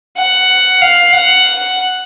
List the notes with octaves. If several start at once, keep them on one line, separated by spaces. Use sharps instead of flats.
F#5
F5
F#5